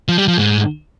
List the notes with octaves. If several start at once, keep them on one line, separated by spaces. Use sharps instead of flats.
F3
G3
F3
G#2